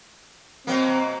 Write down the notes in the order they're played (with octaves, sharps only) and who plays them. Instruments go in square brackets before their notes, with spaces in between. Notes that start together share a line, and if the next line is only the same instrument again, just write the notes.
[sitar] B2 F#3 A#3 [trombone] C4